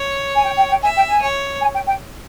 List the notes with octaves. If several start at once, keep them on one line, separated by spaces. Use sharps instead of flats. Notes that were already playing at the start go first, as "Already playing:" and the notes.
Already playing: C#5
G#5
G5
G5
G5
E5 G#5
G5
G#5
C#5
G#5
G5
G5